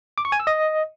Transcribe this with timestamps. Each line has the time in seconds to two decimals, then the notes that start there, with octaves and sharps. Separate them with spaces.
0.18 D6
0.25 C#6
0.32 G#5
0.40 E6
0.47 D#5